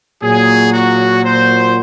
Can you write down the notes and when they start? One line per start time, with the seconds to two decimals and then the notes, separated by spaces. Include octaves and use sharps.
0.23 A#2 F#3 G#4
0.74 F#4
1.24 C5